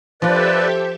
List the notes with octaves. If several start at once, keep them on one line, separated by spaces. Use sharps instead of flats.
F3 F4 G4 A4 B4 C5 D5 E5